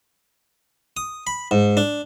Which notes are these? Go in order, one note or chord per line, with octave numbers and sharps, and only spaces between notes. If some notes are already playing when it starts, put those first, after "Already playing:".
D#6
B5
G#2
D4